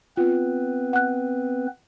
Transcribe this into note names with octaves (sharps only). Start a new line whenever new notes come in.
B3 C4 F4 B4
F#5 F#6